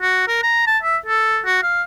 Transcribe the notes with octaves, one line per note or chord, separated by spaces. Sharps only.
F#4
A#4
A#5
A5
E5
A4
F#4
F5